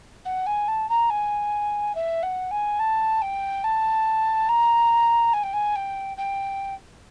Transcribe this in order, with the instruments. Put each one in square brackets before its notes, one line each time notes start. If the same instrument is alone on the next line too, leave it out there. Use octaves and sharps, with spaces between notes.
[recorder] F#5
G#5
A5
A#5
G#5
E5
F#5
G#5
A5
G5
A5
A#5
G#5
G5
G#5
G5
G5